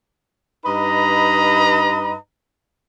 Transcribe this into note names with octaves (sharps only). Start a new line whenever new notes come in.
G2 D#4 B4 D#5 A#5 B5